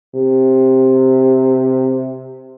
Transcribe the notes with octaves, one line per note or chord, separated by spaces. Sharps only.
C3